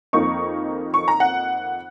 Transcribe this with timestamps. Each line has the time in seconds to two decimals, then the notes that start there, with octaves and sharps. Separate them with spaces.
0.13 F2 D#3 A#3 D#4 C#6
0.94 C#6
1.08 A#5
1.20 F#5